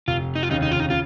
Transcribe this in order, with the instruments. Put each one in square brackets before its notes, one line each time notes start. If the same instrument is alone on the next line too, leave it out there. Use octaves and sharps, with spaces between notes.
[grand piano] F1 [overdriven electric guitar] F4
[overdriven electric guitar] D#4
F4
[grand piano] D#2 C#3 [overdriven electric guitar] D#4
[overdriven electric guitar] D#4
F4
D#4
[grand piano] C#3 [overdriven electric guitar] F4